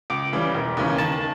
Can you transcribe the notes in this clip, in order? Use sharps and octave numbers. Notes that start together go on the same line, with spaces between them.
C#2 D6
C#3 E3 G3
E1
D#2 C#3 E3
D#3 A5